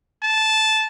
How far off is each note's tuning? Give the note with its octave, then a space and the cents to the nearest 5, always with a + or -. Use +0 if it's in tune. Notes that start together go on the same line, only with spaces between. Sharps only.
A5 -10